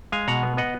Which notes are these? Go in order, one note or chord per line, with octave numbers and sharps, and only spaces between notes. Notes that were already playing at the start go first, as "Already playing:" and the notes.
G#3 F5 G#5
B2 F#5 A#5
B3
B3 D#5 F#5